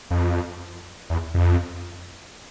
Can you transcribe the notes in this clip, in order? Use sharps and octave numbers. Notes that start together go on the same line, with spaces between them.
F2
E2
F2